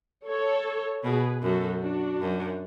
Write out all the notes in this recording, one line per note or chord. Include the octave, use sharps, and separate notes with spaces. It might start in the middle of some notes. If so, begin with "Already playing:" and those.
A4 C#5
B2 G#4 B4
F#2 F#4 A4
D4 F#4
F#2